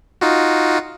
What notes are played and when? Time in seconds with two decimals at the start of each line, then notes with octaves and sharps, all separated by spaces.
0.21 D#4 F4 F#4